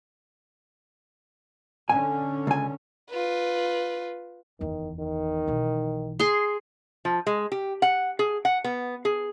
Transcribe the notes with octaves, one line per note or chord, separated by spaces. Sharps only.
D3 C#4 G#5
C#2 G#5
F4 B4
F#1 E2 D#3
D#3
B1 E3
G#4 C6
F3
G#3
G4
F#5
G#4
F#5
B3
G#4